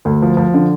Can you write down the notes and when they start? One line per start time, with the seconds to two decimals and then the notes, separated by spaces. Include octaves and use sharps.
0.05 D2
0.22 F3
0.37 F3
0.54 D3